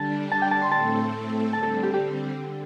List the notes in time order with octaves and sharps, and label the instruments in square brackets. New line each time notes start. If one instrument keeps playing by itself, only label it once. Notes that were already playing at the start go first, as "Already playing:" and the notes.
Already playing: [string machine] D3 G3 D4 [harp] A5
[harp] A5
G5
A5
C6
[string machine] A2 A3 C4 A4 [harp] A5
[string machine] D3 G3 C4 [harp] A5
[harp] A4
G4
G4
[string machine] D3